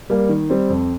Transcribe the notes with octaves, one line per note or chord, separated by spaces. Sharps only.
G3 A#3
D#3
G3 C4
F2